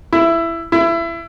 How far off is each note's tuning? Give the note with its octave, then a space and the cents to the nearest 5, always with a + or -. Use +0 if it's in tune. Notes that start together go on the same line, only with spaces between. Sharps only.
E4 +15
E4 +25